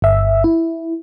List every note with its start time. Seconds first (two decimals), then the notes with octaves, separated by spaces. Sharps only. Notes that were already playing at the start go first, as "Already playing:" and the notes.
0.02 G1 E5
0.44 E4